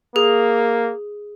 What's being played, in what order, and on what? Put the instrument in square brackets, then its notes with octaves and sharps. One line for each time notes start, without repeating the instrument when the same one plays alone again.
[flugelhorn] A#3 [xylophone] G#4